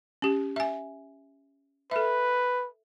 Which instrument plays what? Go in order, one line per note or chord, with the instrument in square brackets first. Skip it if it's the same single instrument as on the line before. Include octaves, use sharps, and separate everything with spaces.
[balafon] C#4 G4
E5 G#5
[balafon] A4 E5 [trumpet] B4